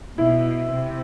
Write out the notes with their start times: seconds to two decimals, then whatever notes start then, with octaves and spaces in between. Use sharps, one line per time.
0.18 B2 E4
0.73 C3